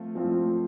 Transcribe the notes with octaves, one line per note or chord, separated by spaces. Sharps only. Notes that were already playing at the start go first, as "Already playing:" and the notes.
Already playing: F3 A3 C4 F4
F3 A3 C4 F4